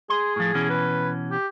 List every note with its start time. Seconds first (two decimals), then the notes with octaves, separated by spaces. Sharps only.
0.10 G#4 C6
0.36 A2 F3
0.55 B2 E3 C#4
0.70 B4
1.31 G4